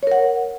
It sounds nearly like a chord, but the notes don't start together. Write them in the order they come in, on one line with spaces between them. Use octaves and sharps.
C#5 A#4 F#5